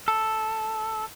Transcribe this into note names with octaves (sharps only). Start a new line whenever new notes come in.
A4